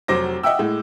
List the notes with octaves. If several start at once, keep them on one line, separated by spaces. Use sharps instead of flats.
F1 F#3 C5 D6 A#6
D#5 E5 F#5 G5 E6
A2 G#3